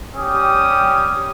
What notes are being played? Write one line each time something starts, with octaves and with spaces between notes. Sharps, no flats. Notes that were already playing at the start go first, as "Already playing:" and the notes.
G3 C#4 G4 D#6